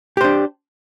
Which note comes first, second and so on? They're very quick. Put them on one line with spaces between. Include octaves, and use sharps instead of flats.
G4 C5 D4